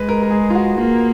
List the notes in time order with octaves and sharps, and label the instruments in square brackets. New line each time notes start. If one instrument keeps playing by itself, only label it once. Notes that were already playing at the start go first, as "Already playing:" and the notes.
Already playing: [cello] G#3 [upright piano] B4
[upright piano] A#4
A#4
G#4
F4
F#4
[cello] A#3 [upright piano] F4